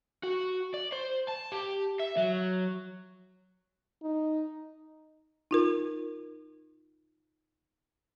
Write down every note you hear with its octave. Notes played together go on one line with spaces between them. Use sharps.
F#4
D5
C5
A5
G4
E5
F#3
D#4
D#4 F4 A#4